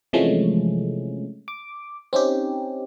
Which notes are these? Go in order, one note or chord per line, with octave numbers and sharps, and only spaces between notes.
C3 E3 F3 G#3 A3 C#4
D6
C4 C#4 D#4 G4